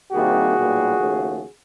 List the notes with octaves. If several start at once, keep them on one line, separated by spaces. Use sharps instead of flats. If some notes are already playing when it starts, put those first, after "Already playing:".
C2 C3 D#3 G3 A#3 F#4 G#4
B1 A#2 G3 A#3
D#2 C#3 F3 A3